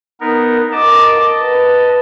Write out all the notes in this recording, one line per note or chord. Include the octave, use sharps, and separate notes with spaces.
B3 D#4 A#4
A#4 D#5 A5 D6
B4